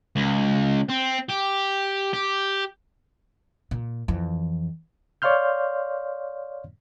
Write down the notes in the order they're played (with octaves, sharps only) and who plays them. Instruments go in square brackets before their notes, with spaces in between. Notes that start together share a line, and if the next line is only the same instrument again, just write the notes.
[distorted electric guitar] C#2
C4
G4
G4
[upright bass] A#2
F2 E3
[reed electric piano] C#5 D5 F5 C6 F6 G6